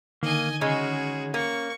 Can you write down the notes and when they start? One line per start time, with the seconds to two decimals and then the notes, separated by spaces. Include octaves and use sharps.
0.23 D3 D#3 A#3 D#4 D#5 G#5
0.61 C#3 G#3 C#4 F#4 G#4
1.34 A#3 C#6